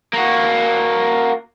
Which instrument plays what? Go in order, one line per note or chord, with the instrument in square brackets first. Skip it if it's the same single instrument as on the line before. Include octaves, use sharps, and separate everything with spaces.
[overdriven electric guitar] A#3 F#4